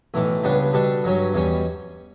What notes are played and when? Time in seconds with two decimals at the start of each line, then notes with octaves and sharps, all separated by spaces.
0.14 B1 A2 E3 A3
0.43 C#2 C#3 G3 B3 D4
0.73 B2 G3 D4 A4
1.04 G2 F#3 C#4
1.34 E2 B2 G3 C#4